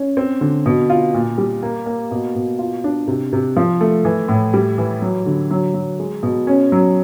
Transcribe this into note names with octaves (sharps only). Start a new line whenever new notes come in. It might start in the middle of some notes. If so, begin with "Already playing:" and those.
Already playing: C#4
C4
D3
B2
F4
A#2
G3
A#3
A#3
B2
B2
F4
D4
C3
C3
F3
A3
E3
A2
G3
E3
F#3
D3
F#3
F#3
G#3
B2
C#4
F#3